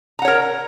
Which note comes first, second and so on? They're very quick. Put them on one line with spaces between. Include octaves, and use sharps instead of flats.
A#5 F#5 C#5 A#4